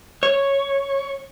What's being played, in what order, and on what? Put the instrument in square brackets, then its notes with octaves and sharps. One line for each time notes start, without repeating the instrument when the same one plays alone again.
[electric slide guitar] C#5